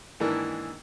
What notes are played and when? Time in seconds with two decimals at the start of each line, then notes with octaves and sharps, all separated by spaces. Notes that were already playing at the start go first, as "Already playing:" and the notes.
0.20 G#2 D#3 E3 A#3 D4 E4